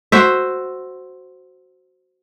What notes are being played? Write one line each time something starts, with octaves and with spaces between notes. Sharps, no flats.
F#4 C5 E5